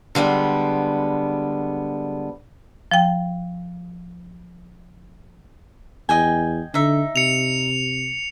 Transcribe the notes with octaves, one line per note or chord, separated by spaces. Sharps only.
D3 G3 G#3 B3
F3 G5
E2 D#5 G5 G#5
D3 D#4 E5
C3 C#7 F7